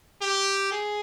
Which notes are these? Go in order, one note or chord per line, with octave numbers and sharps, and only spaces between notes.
G4
G#4